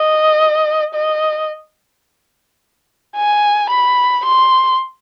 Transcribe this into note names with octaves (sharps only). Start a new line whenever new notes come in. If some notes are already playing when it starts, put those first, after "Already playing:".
Already playing: D#5
D#5
G#5
B5
C6